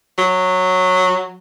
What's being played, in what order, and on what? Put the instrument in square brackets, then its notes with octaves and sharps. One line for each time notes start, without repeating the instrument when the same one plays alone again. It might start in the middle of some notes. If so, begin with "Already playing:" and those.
[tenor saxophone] F#3